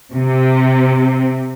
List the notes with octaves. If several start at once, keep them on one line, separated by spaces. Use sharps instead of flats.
C3